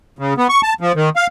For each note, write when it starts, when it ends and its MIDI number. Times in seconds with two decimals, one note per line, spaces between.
0.19 0.34 49
0.37 0.47 59
0.49 0.61 85
0.63 0.74 81
0.81 0.92 53
0.95 1.09 51
1.16 1.27 77